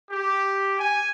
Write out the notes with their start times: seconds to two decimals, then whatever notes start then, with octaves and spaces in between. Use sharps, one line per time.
0.10 G4
0.79 G#5